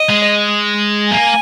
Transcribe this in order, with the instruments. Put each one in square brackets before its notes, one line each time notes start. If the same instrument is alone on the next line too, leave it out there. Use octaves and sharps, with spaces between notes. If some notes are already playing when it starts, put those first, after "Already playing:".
Already playing: [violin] D#5
[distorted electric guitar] G#3
[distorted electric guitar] A#3 [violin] G#5